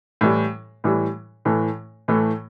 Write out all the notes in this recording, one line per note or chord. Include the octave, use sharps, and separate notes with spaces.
A2 E3 G3
A2 E3 G3
A2 E3 A3
A2 E3 A3